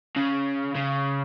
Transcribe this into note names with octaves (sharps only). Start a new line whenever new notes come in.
C#3
C#3